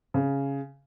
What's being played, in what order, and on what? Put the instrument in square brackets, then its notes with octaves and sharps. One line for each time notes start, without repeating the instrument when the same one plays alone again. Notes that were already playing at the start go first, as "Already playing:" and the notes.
[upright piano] C#3